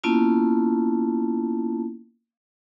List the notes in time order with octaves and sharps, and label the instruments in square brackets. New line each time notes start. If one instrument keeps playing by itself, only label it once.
[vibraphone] A#3 B3 C#4 E4 F4 A5